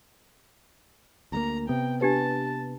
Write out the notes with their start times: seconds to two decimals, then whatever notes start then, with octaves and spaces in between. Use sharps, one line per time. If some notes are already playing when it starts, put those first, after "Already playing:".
1.32 D2 G#3 A#3 A#5
1.69 C3 B3 G5
2.01 D4 G4 B4 A5